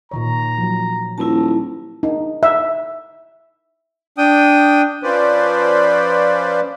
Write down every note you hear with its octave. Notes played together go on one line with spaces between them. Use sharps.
A#2 D#3 C#5 A#5
F3 F#3
D#1 E4 A5
D#4
E5
D4 G5 D#6
F3 C#4 B4 C5 D5